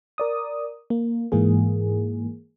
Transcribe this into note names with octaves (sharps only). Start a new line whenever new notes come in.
A#4 D5 D#6
A#3
G#2 E3 A#3 G#4